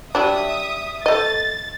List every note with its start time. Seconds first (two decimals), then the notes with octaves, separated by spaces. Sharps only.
0.15 F#3 G3 D4 E5 D#6
1.06 A3 D#5 A6